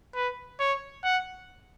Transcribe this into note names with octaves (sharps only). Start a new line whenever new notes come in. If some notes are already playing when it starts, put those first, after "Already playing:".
B4
C#5
F#5